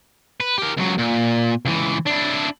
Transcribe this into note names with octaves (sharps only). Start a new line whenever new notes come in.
B4
G4 A#4
C#2 F#3
A#2
C#2 E3
D4 E4